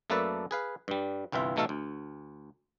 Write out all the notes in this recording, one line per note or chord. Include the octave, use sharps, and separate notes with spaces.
F#2 A3 A#3 A4 B4 D5
G#4 B4 F5
G2 G3
G1 C2 E3 F4 E5
A1 B2 A3 D#4 A4 F5
D2